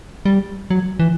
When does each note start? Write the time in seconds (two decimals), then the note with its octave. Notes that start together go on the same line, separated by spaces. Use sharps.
0.25 G3
0.70 F#3
0.99 E3